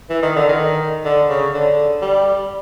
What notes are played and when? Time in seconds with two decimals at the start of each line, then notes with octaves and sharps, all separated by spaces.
0.10 E3
0.22 D#3
0.36 D3
0.49 D#3
1.05 D3
1.30 C#3
1.54 D3
2.02 G3